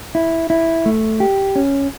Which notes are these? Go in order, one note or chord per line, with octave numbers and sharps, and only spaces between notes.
E4
E4
A3
G4
C#4